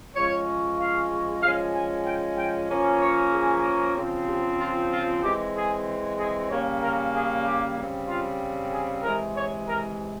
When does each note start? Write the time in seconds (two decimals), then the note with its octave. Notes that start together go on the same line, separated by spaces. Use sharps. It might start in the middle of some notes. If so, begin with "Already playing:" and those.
0.15 F3 G#3 C#4 C#5
0.79 F5
1.42 F3 G#3 C#4 F5
1.74 G#5
2.05 G5
2.37 G5
2.69 F3 A#3 C#4
3.01 C#5
3.33 G#4
3.96 C#3 F3 C4
4.28 G4
4.59 F4
4.91 F4
5.22 E3 G#3 C4 G4
5.55 G#4
6.18 G#4
6.50 C#3 G3 A#3 C#4 C#5
6.81 A#4
7.13 G#4
7.44 G4
7.77 C#3 G3 C4
8.08 F4
8.72 G#4
9.03 C3 E3 G#3 A#4
9.35 C#5
9.67 A#4